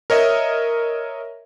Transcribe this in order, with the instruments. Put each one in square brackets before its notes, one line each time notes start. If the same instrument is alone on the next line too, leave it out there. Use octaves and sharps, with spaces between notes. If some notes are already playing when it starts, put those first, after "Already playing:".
[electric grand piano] A#4 C#5 D#5 E5